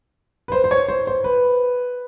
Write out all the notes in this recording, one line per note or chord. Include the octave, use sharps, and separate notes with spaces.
B4
C5
C5
C#5
C5
C5
B4